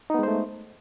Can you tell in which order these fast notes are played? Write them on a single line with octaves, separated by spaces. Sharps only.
D#4 B3 G#3 C5 A3